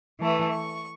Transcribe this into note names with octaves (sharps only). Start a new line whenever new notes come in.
E3 A3 B4
C#6